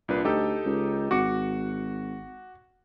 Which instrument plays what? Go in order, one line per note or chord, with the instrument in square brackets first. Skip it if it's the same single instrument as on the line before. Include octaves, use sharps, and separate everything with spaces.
[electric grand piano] C2 D4 B4 [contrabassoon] A#2
[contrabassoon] D2 [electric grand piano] D#4 G4 A4
[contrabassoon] C#2
[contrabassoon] G#1 [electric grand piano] F#4 D6 C#7